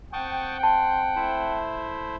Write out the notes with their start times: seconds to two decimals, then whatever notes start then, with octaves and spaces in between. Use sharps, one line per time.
0.13 C4 F#5 G5 A5 C#6 D#6
0.63 A5 C6
1.16 A3 E4 C5